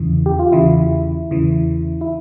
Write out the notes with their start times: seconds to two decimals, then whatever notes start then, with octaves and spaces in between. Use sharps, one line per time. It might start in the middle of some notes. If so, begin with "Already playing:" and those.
Already playing: E2 C#3 E3
0.26 G4
0.39 F4
0.52 E2 C#3 E3 E4
1.31 E2 C#3 E3
2.01 E4